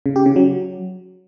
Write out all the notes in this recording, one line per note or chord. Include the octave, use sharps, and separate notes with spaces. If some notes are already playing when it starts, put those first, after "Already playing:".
C#3
G4
C#3
F#3